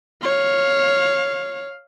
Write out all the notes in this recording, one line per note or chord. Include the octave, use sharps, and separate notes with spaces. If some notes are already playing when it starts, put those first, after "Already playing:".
C#5 F5